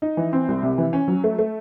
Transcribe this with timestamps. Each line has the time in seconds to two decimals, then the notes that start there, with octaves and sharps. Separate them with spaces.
0.02 D#4
0.17 E3
0.33 C4
0.48 C2
0.63 C3
0.78 E3
0.93 C#4
1.08 F#3
1.24 A3
1.39 A3